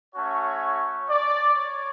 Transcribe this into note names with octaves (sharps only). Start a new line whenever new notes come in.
A3 C#4 F#4 C#5
D5
C#5